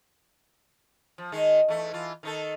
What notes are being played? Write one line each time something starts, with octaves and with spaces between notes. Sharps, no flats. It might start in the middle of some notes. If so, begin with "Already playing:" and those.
F3
D#3 G#3 D#4
E2 A3
E3 F4
D#3 D#4 A4